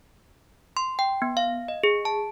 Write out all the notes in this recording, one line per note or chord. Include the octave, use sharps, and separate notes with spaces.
C6
G5
B3
F5
D#5
G#4
A5